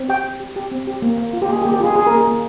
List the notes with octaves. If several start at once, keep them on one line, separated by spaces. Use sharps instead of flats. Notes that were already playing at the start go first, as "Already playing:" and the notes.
Already playing: C4
G4 G5
G4
G4
G4
C4
G4
A#3
A#3
F4
G4
A#3 G#4
G4
A#3
G4
F4 G#4
F4 G#4
A#3 A#4
G#4
A#3